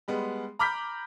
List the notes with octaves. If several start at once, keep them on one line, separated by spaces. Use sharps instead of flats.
G3 G#3 B3
A#5 B5 D6 F6 G6 B6